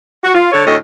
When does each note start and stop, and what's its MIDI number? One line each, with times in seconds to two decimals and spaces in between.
0.23 0.30 66
0.35 0.51 65
0.52 0.63 50
0.52 0.63 69
0.52 0.63 73
0.65 0.76 38
0.65 0.76 45
0.65 0.76 69
0.65 0.76 73
0.65 0.76 75